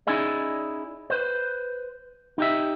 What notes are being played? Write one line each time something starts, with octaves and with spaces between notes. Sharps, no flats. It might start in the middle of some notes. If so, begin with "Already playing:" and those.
C#4 D#4 E4 G#4 D5
B4 C5
D#4 G4 E5